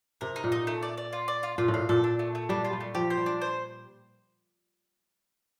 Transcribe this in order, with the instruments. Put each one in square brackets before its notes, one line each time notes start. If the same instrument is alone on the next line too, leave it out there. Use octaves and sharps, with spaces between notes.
[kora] C3 [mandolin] A#4
[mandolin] D#4
[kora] A#2
[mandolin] D#4
A3
D5
D5
F4
D5
F4
[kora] A#2 [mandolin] F4
[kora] A2
[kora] A#2 [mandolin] F5
[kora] A#2 [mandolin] A4
[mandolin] D4
A3
A3
[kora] G3 [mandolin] D4
[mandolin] F4
[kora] G3
[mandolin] A3
[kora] F3 [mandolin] G4
[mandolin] C5
[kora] G3
[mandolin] D4
C5